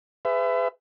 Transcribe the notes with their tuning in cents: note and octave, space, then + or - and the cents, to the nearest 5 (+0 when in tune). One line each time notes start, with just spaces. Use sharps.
G#4 -5 B4 +40 E5 +25